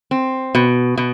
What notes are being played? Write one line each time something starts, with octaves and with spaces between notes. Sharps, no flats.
C4
B2
B2